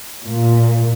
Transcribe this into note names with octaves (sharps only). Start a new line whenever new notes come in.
A#2